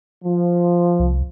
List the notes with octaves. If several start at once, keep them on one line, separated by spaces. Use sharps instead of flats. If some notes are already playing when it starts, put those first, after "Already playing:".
F3
C2